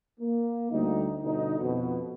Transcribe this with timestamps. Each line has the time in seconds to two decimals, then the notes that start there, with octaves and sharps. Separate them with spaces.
0.20 A#3
0.71 D2 G3 D#4
1.23 G1 B2 D3 D#4
1.59 F2 B2